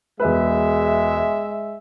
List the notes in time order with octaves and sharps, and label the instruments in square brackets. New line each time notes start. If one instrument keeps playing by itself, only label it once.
[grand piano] E1 B4 [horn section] G#3 E5